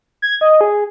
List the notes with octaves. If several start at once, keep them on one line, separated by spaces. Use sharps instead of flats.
G#6
D#5
G#4